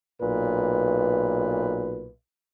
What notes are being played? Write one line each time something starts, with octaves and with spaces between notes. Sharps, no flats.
B1 A#2 B4